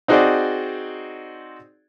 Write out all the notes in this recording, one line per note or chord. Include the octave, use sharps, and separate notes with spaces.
C4 D#4 F#4 G#4 C5 D5